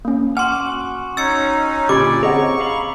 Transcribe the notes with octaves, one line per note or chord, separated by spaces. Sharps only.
A#3 C#4
F#4 F#5 G#5 C6 D6 F6
C#4 D#4 E6 G#6 A6 C#7
A#2 D3 C#4 G4 D5 B5 D6 G#6
C4 G#4 C#5 D#5 F#5 A#5 C#6
F5 A#5 B5